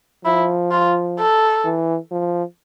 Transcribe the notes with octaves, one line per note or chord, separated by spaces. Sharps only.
F3 E4
F4
A4
E3
F3